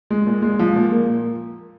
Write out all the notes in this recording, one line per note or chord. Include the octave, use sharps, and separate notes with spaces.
G#3
A#2
G#3
F3
A#2
A#3